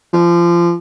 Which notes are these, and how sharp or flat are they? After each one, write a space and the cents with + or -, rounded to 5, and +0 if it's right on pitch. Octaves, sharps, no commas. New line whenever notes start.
F3 -25